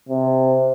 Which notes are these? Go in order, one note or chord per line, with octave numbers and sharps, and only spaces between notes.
C3